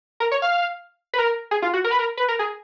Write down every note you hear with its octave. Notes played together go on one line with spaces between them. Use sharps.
A#4
C#5
F5
B4
A#4
G#4
F4
F#4
A#4
B4
A#4
B4
A#4
G#4